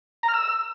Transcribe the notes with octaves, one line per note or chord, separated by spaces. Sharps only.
A#5
F6
E6